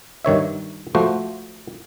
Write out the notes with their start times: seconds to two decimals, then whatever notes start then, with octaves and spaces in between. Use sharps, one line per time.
0.25 G2 D#3 C#5 E5
0.95 F3 A3 F#4 C5